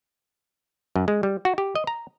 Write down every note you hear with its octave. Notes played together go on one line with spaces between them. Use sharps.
F#2
G#3
G3
F#4
G4
D#5
A#5